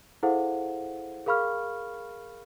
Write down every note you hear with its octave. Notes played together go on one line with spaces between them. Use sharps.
E4 G#4 A4 C5 F5 F#5
G#4 A#4 F5 B5 C#6 F6